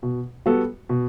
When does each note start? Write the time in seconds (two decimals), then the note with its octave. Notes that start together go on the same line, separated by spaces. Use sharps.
0.03 B2
0.46 G3 B3 F#4 A4
0.89 B2